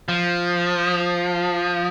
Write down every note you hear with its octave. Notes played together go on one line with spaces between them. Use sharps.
F3